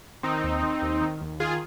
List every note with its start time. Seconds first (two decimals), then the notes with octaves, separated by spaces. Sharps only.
0.23 D#3 C4 D#4
0.44 D#2
0.63 D#3
0.82 D#2
1.01 D#3
1.21 D#2
1.40 D#3 F4 G#4